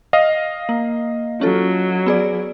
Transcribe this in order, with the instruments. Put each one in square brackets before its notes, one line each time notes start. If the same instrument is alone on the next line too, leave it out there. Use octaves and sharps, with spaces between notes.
[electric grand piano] D#5 F5
[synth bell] A#3
[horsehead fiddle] F#3 [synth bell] C#4 F4 A4
[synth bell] B3 G#4 D5